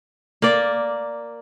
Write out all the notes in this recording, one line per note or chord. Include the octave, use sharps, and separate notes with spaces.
A#3 D5